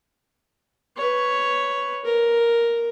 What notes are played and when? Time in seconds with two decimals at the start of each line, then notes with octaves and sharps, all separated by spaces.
0.97 B4 C#5
2.05 A#4